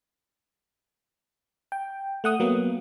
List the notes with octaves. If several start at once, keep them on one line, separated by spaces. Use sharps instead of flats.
G5
A3 F#5 D#6
F#3 A#3 B3